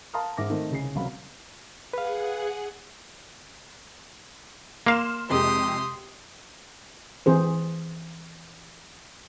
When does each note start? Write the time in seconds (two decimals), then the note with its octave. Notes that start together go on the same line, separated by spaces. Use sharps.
0.14 F5 A5 A#5 C6 D#6 F6
0.37 G#2 E5 D6 A#6
0.50 D#3 A3 C4 D#4
0.71 C2 C#3 G#4 C7
0.95 C#2 C3 F#3 F5 B5
1.93 G#4 B4 F5 F#5
4.86 A#3 F5 C6 F6 E7
5.30 F2 C3 G#3 G4 C6 D#6
7.26 E3 C4 G#4 C5